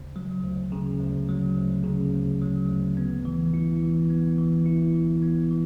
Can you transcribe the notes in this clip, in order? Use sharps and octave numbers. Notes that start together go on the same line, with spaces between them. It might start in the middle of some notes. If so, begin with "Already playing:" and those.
Already playing: D2 C#3
F#3
D2
C#3
D2
F#3
D2
C#3
D2
F#3
D2
B3
E3
E4
E3
B3
E3
E4
E3
B3
E3